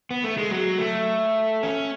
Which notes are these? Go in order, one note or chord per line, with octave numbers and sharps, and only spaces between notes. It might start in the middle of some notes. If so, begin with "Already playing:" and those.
B3
A3
G#3
F#3
A3
C#4